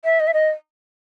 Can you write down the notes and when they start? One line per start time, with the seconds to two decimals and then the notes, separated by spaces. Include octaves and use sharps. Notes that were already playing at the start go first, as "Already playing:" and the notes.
0.04 E5
0.20 D#5
0.27 E5
0.34 D#5